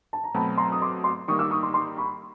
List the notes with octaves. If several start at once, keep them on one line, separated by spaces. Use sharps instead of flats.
A5
A#5
B2 F#3 A3 C4 A5 B5
A#5 C6
D#6
C6 D6
C6 D6
D#3 G3 A#3 D#4 C#6 D#6
D6 E6
C#6 D#6
C6 D6
C6 D6
B5 C#6